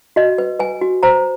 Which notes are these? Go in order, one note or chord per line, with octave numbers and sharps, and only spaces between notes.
F#4 D#5
B4
B4 G#5
F#4
C5 A#5